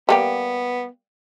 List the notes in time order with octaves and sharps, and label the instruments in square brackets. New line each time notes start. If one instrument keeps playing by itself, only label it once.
[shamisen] G3 A#3 G4 [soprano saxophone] B3